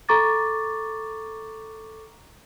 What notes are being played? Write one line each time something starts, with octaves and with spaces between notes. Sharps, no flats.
A4 A#5 C#6 D6 A6